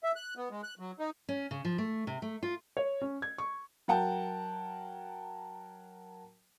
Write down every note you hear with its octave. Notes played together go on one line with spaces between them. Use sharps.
E5
F#6
B3
G#3
F#6
F#3
D#4
C#4
C#3
F3
A3
C3
A3
F4
C#5
C#4
G#6
C#6
F#3 A#4 F#5 G5 A5